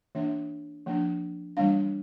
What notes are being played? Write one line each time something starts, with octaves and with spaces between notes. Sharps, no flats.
E3 A#3 D4 E5
F3 A#3 D4
E3 G3 A#3 D4 F5